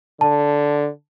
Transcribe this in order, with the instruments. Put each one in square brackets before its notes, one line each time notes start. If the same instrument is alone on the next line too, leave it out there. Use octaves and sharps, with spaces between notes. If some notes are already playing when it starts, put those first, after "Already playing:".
[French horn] D3 [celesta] A5